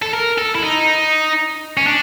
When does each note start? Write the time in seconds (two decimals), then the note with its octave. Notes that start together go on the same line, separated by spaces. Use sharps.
0.02 A4
0.13 A#4
0.38 A4
0.55 E4
0.63 D#4
1.77 C#4
1.87 D4